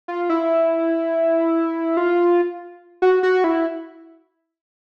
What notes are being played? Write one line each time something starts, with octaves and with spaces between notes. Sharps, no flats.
F4
E4
F4
F#4
F#4
E4